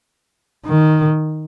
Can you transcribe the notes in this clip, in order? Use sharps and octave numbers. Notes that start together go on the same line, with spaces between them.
D#3